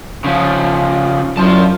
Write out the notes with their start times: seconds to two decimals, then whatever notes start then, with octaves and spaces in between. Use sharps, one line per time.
0.24 C#3 F3
1.37 F#2 D4 E4 F4 A5